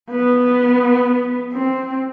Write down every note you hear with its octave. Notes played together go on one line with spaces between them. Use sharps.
B3
C4